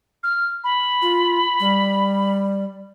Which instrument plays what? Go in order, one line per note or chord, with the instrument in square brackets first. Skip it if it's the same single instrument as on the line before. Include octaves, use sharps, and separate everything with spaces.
[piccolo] F6
B5
[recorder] F4
G3